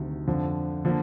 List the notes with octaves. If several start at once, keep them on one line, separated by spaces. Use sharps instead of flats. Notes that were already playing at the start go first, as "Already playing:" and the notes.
Already playing: D2 C3 D#3 F#3
F2 D3 F3
D3 F3 A#3